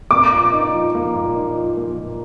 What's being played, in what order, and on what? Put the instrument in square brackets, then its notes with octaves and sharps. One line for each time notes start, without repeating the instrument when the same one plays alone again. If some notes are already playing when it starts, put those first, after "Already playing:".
[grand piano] A#3 [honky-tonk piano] D6
[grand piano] A#2
D#4
F3
A#3
A#2
D#4
F3
A#3
A#2